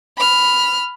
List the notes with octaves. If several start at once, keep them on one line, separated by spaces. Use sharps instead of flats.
B5 F6